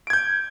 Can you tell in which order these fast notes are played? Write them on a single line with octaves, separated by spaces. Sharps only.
D7 G#6 G6